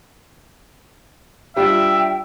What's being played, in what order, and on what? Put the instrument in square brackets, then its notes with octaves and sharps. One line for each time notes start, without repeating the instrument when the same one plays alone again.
[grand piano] G3 D4 F4 [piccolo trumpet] E5 [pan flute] G5